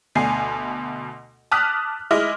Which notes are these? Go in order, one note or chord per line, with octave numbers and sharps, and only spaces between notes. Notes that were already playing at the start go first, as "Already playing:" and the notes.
D2 B2 G#5 C7
A5 D6 D#6 F6 F#6 B6
G#3 E4 D#5 D6 F6